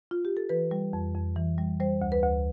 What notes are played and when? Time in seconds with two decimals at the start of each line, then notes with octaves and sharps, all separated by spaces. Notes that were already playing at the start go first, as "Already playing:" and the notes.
0.11 F4
0.25 G4
0.37 A4
0.49 E3 B4
0.71 G3
0.93 F2
1.15 F2
1.36 E3
1.58 G3
1.80 G3 C5
2.02 D2
2.12 B4
2.24 D2